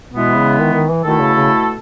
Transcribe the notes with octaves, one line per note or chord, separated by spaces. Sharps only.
B2 E3 G#3 B3
C#3
D#3
D#3
E3
B2 D#3 A3 E4 A4
C#3
C#3